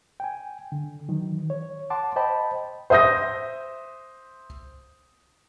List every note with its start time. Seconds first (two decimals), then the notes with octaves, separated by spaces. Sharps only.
0.20 G5 G#5
0.72 D3
1.08 D#3 E3 F#3
1.50 C#5
1.90 F#5 A5 C6 D6
2.16 C5 D#5 G5 A5 B5
2.90 C5 E5 D#6 G6 A#6